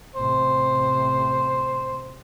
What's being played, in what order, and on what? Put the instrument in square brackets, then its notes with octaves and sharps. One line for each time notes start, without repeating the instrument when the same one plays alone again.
[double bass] A1 C3 [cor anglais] C5